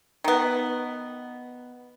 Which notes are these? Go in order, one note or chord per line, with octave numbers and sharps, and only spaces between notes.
D#3 B3